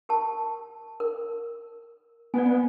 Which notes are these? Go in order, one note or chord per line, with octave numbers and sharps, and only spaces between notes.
G4 A#4 A5
A#4
B3 D5 G#5